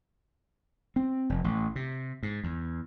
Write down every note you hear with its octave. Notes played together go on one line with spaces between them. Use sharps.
C4
F1
A1
C3
G#2
E2